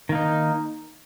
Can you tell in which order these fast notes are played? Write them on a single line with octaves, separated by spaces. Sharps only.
D#3 A#3 D#4